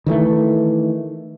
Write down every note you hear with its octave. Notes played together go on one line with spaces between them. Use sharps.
D#3 E3 G3 A3